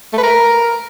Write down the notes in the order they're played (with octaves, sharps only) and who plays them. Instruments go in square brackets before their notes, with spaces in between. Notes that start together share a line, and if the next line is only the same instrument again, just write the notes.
[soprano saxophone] A3
B4
A#4